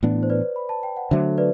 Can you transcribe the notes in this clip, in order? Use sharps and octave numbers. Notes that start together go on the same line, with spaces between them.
A2 E3 B3 D4
C5
B4 D5
B5
A5
G5
F#5
D3 F#3 A3 C5 E5
B4 D5